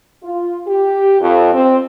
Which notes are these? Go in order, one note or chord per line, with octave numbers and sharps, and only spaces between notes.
F4
G4
F2
C4